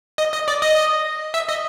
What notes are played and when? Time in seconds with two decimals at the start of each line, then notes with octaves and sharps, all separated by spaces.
0.18 D#5
0.33 D#5
0.48 D5
0.62 D#5
1.34 E5
1.49 D#5